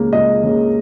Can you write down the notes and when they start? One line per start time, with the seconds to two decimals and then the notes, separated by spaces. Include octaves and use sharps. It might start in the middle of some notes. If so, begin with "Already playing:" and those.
Already playing: C#2 C#3 A#3
0.13 C#2 D#5
0.43 C#3 A#3